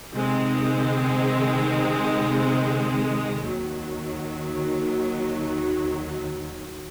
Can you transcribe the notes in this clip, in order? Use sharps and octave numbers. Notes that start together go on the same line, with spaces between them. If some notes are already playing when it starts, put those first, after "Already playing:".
C3 D#3 G#3 C4
D#2 D#3 F#3